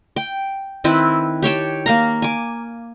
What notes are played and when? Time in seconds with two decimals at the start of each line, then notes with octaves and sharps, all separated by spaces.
0.16 G5
0.84 D#3 C4 E4 B4
1.42 G4 C#5 G5 A5
1.86 A#3 F5 A#5
2.22 G#5 D6